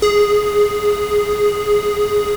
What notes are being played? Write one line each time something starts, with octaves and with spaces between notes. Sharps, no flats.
G#4